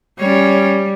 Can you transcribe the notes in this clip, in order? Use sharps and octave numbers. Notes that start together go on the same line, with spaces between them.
G3 C#4 C#5